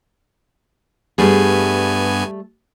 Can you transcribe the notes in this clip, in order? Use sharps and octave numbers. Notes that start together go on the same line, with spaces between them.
G2 G3 A3 B3 G#4 G#5